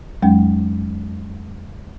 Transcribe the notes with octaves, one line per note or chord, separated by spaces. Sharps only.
F2 F#3 G#3 C#4 G5